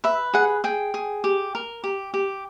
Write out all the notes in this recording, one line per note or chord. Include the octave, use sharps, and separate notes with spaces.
B4 E5
G#4 F#5
G#4 G5
G#4
G4
A#4
G4
G4